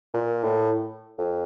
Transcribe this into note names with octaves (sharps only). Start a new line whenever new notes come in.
A#2
A2
F2